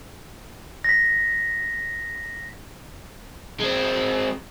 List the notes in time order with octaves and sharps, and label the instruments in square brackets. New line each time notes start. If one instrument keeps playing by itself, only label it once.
[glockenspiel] A#6 B6
[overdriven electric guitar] G#3 C4